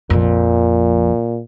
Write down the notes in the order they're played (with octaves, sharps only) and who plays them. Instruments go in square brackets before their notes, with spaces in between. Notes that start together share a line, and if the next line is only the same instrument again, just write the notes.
[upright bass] A#1 F2 [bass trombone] A#2